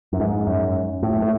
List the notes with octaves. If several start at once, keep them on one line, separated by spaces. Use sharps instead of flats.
F#2
G#2
F#2
A2
A2